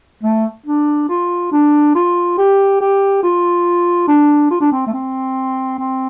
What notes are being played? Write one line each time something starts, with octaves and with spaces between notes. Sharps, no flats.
A3
D4
F4
D4
F4
G4
G4
F4
D4
F4
D4
C4
A3
C4
C4